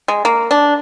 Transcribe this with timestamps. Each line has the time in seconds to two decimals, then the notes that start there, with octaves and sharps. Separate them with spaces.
0.08 G#3
0.25 A#3
0.51 D4